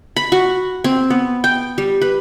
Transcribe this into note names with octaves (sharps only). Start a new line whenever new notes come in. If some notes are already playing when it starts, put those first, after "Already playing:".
B5
F#4
C4
B3
G5
G3
B4